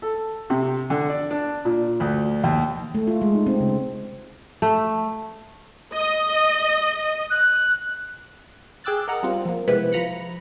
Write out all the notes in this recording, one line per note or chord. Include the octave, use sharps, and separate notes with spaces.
A4
C3
D3
D5
D4
A#2
D2
D#2
A3
F4
G#3
D#4
C4
C#3
A3
D#5
F#6
G#4 G5 D6 E6 F#6 A6
A#4 D#5 F#5 A#5
G3 C4 F4
F3 A#3
C3 G#3 B3 C4 E4 B4
F3 F4 A#5 B5 C#7